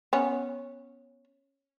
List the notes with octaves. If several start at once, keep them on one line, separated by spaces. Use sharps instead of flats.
B3 C#4